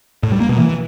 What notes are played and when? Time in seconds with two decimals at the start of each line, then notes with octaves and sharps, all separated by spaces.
0.23 A2
0.32 G3
0.40 A#3
0.49 B2
0.58 E3